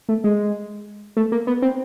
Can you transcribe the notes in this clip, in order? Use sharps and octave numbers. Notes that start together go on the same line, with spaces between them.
A3
G#3
A3
A#3
B3
C4